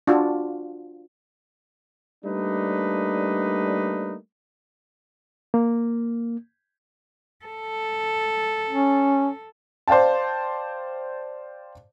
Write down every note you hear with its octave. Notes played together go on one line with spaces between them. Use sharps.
D4 F4 F#4
G3 A3 A#3 D4 D#4 B4
A#3
A4
C#4
C5 D5 F5 G5 A5